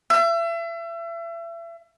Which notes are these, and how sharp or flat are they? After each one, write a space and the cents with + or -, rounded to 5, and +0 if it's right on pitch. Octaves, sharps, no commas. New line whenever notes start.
E5 +35